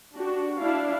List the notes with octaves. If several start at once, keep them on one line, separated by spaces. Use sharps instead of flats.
D4 F#4 G4
D4 E4 D5 F5